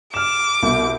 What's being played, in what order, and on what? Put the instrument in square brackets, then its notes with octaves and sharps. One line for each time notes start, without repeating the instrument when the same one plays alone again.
[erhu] D6 [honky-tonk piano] F6 E7
[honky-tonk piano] C2 B2